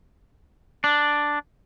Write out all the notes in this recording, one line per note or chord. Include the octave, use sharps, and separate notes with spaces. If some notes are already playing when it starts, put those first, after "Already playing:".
D4